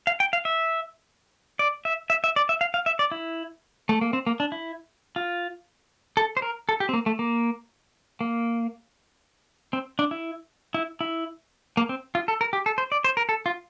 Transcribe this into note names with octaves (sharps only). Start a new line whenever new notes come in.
F5
G5
F5
E5
D5
E5
E5
E5
D5
E5
F5
F5
E5
D5
E4
A3
A#3
C4
A#3
D4
E4
F4
A4
C5
A#4
A4
G4
C4
A#3
A3
A#3
A#3
C4
D4
E4
E4
E4
A#3
C4
F4
A4
A#4
G4
A4
C5
D5
C5
A#4
A4
F4